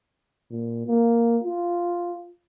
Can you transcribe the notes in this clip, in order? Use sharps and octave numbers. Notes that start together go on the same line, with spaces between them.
A#2
A#3
F4